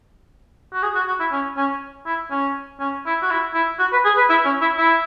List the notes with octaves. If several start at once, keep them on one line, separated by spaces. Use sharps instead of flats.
F#4
G#4
F#4
F#4
E4
C#4
C#4
E4
C#4
C#4
E4
F#4
E4
E4
F#4
B4
G#4
B4
E4
C#4
E4
E4